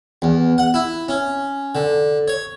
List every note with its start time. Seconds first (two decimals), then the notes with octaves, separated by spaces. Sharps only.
0.22 E2
0.58 F#5
0.74 E4
1.09 C#4
1.75 D3
2.28 C#5